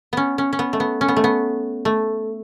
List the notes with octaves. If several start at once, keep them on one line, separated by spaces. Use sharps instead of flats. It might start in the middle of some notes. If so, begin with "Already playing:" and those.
B3 C#4
C#4
C#4
B3
A3
B3
C#4
B3
A3
B3
A3